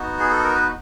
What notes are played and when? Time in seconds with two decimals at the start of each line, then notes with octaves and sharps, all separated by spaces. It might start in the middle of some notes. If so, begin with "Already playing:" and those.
Already playing: B3 D#4 F#4
0.20 G#4
0.32 A4
0.44 A#4
0.55 B4